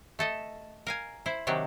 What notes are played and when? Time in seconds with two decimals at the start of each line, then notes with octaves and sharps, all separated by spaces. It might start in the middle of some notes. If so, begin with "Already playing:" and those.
0.19 A3 A4 D#5
0.87 A#4 F5 G#5
1.26 E4 C5
1.47 C3 D#3 F#3 D4 G4